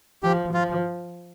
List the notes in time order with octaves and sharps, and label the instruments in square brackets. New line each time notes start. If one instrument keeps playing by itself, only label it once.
[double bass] F3 [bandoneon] G4
[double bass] F3 [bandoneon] F4